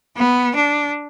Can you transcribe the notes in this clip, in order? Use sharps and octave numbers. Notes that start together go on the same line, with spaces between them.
B3
D4